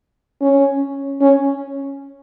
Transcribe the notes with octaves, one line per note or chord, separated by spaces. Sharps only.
C#4
C#4